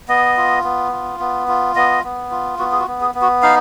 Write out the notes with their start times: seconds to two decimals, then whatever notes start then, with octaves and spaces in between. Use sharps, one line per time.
0.09 B3 D#5
0.37 F4
0.64 B3
0.92 F4
1.20 B3
1.48 F4
1.76 B3 D#5
2.04 B3
2.31 F4
2.59 B3 F#4
2.72 G#4
2.80 F#4
2.87 B3
3.01 G#4
3.15 B3
3.22 F#4
3.42 D#4 F5